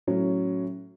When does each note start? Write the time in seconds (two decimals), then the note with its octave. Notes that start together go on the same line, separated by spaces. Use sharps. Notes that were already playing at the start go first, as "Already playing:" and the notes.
0.07 A2 F#3 C#4